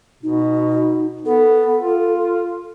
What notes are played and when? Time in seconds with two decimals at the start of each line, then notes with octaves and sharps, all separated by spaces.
0.23 B2 D#4
1.26 B3 A4
1.81 F4